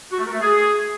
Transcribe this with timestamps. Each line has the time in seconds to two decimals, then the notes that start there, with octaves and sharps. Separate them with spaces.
0.11 F#4
0.18 A3
0.26 A#4
0.33 A3
0.41 G#4